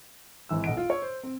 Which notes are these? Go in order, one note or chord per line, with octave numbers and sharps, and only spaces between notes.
G#1 E3 E6
B1 D#5 F#5 D7
F4
C#5
C5
C4